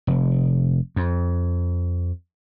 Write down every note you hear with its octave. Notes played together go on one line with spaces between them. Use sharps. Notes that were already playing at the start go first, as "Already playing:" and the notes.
F1
F2